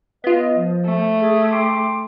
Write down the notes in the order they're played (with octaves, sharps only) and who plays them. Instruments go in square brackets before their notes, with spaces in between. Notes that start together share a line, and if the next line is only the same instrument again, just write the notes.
[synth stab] B3 F4 [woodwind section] D#5
[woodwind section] F3
[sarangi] A3
[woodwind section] G#4
G5 C6 D6